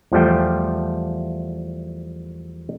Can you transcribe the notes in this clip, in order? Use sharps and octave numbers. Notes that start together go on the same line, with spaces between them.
E2 F3 G3 A3 G5